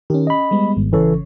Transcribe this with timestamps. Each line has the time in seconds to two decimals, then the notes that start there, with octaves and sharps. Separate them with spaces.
0.10 D#3 C#4 G4
0.27 D#5 B5
0.51 G3 G#3 B3
0.77 G#1
0.93 G#1 C#3 E3 A4 C#5